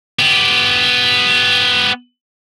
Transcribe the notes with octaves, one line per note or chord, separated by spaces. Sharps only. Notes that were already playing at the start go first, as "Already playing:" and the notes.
B3 G4